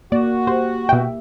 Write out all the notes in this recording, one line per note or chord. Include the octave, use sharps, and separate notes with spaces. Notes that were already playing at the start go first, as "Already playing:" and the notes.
A#3 F#4 D5
G4 C5
B2 E5 G5